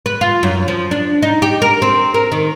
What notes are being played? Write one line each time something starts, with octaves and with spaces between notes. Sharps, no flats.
B4
F4
F#2
F3
D4
D#4
G4
A#4
C4
A#4
D#3